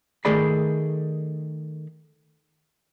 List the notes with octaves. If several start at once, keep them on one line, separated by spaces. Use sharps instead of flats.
D#3 A3 G#4 D5 B5